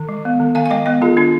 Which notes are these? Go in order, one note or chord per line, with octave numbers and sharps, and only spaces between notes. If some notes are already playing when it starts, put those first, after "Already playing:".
Already playing: D#3
G#3
B3
D#3
D#3 F5 G#5
G#5
G#3 D#5 G5
B3 D#5 G5
D#3 F4 G#4
D4 F4